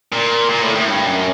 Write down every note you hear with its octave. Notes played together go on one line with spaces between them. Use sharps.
A#2
A#2
A2
A2
G2
F#2